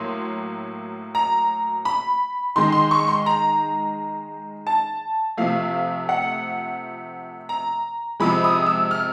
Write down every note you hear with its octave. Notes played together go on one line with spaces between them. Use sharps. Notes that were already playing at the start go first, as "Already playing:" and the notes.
Already playing: A2 F#3 A#3 C6
A#5
B5
D#3 G#3 C6
C6
C#6
C6
A#5
A5
C3 F3 A3 F5
F#5
A#5
C3 F3 G#3 B5
D#6
E6
F6